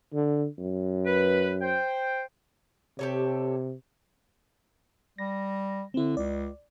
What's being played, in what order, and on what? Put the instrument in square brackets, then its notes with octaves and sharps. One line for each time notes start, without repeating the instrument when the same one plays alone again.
[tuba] D3
F#2
[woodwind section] B4
C5 G5
[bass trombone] C3 [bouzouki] G4 A4 C#5
[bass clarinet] G3 [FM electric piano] A#6
[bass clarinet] D3 [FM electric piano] C4 E4
[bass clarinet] C#2 [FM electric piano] D5